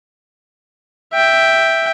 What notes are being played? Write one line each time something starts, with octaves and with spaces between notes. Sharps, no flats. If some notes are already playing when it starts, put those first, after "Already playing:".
E5 G5